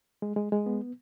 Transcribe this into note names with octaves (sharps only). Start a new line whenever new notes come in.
G#3
G#3
G#3
B3